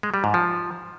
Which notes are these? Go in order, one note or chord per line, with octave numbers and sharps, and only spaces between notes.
G#3
G3
G#2
F3